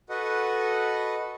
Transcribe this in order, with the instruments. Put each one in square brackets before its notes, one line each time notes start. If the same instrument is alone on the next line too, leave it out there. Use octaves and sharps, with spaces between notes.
[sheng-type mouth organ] F#4 A4 B4 D#5 F#5